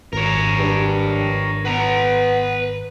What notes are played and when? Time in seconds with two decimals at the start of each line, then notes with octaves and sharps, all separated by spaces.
0.13 G#1 A#4 C#5
0.59 G2
1.65 B3 B4 A#5